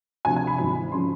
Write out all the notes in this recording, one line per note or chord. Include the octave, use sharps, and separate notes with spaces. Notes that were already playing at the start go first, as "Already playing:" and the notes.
D2 C3 F3 G#5
G#5
B5
G#1 G#2 E3 B5
C#3 F3 C6